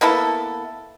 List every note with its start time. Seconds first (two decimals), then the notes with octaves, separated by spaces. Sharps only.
0.01 A#3 B3 E4 A4